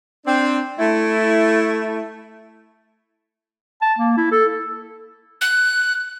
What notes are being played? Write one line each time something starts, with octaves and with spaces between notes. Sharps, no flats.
C4 D4
A3 E4
A5
A#3
E4
A4
F#6